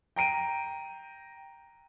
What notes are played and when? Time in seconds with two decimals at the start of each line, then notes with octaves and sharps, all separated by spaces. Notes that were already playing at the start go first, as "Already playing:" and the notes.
0.16 G5 A#5 D7 D#7